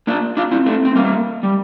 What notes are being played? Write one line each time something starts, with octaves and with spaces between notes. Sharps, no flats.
A#3 D4
D4 F4
C4 E4
A3 C4
C4
G3 A#3
G3